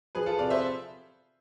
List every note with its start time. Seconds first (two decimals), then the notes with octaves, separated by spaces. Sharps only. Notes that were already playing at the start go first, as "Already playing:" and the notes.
0.15 F3 G#4 B4
0.26 F4 A4
0.38 C3 D5 F5
0.50 C5 E5